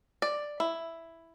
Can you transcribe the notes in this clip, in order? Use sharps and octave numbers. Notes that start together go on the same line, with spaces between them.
D5
E4